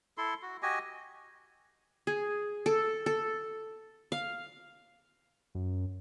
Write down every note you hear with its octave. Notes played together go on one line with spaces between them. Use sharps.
E4 A4 C6
F#4
F#4 G4 D#5 G#5
G#4
A4
A4
F5
F#2